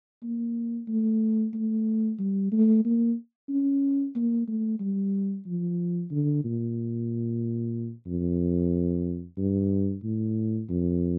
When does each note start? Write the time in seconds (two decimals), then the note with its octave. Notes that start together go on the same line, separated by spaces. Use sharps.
0.23 A#3
0.88 A3
1.54 A3
2.19 G3
2.52 A3
2.85 A#3
3.49 C#4
4.16 A#3
4.48 A3
4.80 G3
5.46 F3
6.11 D3
6.44 A#2
8.07 F2
9.37 G2
10.04 A2
10.69 F2